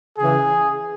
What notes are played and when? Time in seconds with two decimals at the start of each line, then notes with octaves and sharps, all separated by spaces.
0.18 C#3 E3 G#4